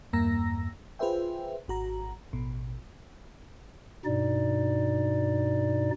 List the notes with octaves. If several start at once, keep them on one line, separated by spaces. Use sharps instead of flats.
E2 G2 A#3 A#5 E6 A#6
F4 G#4 B4 C5 E5 G5
G#1 F#4 A#5
A1 B2
G2 B2 D#4 D5